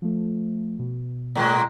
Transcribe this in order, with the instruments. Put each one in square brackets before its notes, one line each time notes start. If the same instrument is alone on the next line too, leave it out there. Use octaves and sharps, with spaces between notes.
[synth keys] F3 A3
B2
[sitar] A2 G#3 A#3